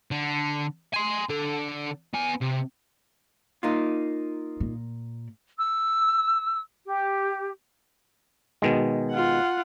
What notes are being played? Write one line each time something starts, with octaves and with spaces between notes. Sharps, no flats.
D3
G#5 C6
D3 A4
B3 G#5
C3
A#3 D#4 F4
A#2
E6
G4
B2 D#3 G#3
F4 F#5